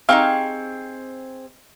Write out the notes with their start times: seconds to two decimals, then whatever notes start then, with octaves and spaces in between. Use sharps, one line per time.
0.09 C4 D#4 G4 G#4 F5 C#6